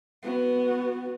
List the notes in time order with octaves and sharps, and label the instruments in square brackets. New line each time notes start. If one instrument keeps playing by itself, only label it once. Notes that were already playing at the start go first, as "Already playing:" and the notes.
[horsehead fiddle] B3 F#4